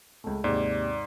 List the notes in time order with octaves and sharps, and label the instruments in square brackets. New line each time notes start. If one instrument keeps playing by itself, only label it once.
[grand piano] C#2 A3
[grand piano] D#2 C3 [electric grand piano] G#2 [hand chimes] D5